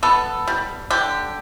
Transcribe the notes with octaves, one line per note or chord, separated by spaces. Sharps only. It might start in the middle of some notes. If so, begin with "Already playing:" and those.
B3 A4
G3
D3 G4